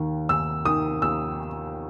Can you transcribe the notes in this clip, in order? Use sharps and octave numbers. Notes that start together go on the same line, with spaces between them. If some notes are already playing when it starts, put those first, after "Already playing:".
Already playing: D#2 D#3
D#2 E6
D#3 D#6
D#2 E6